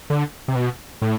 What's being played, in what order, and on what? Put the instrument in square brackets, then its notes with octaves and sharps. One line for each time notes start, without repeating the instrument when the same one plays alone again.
[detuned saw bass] D3
C3
B2
A2